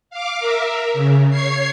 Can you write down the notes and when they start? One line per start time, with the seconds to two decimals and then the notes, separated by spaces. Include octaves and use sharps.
0.10 F5 D6
0.39 A#4 E5
0.94 C#3
1.30 C#5 G#6 C7